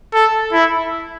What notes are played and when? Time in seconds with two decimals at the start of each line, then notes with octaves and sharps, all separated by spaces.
0.14 A4
0.53 E4